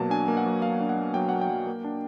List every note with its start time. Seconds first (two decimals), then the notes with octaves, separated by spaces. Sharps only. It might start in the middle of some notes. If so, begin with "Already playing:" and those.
Already playing: B2 F#3 A#3 A5
0.10 D4 G#5
0.28 A#3
0.37 F#5
0.46 F#3
0.62 A#3 F5
0.81 D4
0.89 F#5
0.98 A#3
1.14 F#3 G5
1.29 A#3 F#5
1.41 G5
1.50 F#3
1.67 A#3
1.84 D4